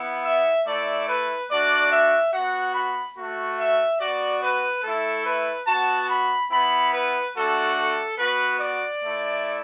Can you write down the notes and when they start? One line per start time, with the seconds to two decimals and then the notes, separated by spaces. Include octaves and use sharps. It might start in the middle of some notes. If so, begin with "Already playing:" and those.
Already playing: B3 E4
0.24 E5
0.66 A3 E4 D5
1.07 B4
1.49 A3 D4 F#4 D5
1.91 E5
2.33 B3 F#4 F#5
2.75 B5
3.17 A3 F#4
3.59 E5
4.00 B3 F#4 D5
4.41 B4
4.83 A3 E4 A4
5.25 B4
5.67 B3 F#4 A5
6.09 B5
6.51 B3 E4 B5
6.92 B4
7.34 A3 D4 F#4 A4
7.77 A4
8.18 B3 F#4 B4
8.60 D5
9.01 A3
9.07 E4